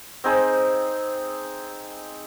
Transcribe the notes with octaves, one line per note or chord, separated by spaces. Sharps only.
C4 D#4 G#4 C5